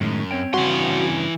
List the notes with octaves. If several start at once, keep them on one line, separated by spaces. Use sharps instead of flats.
F#2 A2 D#3 G#3
C4 C#5 G5
G2 C#3 E3 F#4 C6